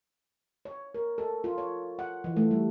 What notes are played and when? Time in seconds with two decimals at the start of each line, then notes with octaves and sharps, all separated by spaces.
0.65 C#5
0.95 A#4
1.18 A4
1.44 F4
1.58 C#5
1.99 F#5
2.24 E3
2.37 A3
2.51 G3